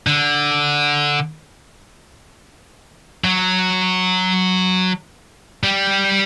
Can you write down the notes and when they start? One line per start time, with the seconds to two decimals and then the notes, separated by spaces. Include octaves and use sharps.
0.07 D3
3.24 F#3
5.64 G3